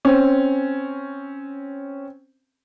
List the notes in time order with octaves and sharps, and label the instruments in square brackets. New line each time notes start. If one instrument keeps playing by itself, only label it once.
[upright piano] C4 C#4